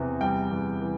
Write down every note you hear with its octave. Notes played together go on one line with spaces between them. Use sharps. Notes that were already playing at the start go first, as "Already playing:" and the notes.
Already playing: E2 C3 E3
G3 G5
E2
E3